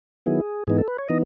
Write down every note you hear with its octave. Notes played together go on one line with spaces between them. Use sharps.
D#3 F#3 B3 E4 G#4
G#2 E3 B3 D#4 G#4
A4
B4
C#5
E3 B3 D#4 D#5